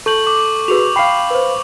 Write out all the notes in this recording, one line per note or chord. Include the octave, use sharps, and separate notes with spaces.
A4 C#6 G6 F#7
D6
F#4 G#4 B4 F7
F5 G5 B5 C7
B4 C5